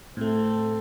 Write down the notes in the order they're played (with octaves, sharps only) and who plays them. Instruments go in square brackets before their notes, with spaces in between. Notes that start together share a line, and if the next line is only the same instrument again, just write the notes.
[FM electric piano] A2 A3 [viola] C4 A4